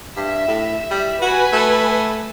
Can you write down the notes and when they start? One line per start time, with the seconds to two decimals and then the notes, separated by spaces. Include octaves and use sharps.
0.17 G2 E5
0.48 A2
0.91 G3
1.22 F#4 B4 G#5
1.53 A3